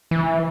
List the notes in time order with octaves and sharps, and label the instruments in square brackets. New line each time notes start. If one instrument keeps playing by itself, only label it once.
[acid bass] E3